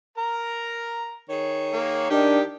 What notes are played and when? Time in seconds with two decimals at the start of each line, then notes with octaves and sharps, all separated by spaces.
0.18 A#4 A#5
1.29 D#3 G#4 C#5
1.73 A#3
2.10 D#3 D4 G4